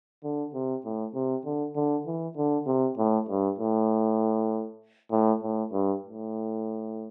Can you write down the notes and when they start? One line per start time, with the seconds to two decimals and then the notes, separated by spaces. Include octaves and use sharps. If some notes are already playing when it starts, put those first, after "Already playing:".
0.24 D3
0.54 C3
0.85 A2
1.14 C3
1.45 D3
1.76 D3
2.06 E3
2.37 D3
2.67 C3
2.97 A2
3.29 G2
3.59 A2
5.11 A2
5.43 A2
5.72 G2
6.04 A2